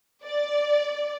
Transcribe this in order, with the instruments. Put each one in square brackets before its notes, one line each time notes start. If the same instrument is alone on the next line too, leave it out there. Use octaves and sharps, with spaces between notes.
[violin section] D5